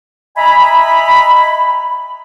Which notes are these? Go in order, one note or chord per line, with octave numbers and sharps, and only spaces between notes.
D#5 E5 G#5 A#5 B5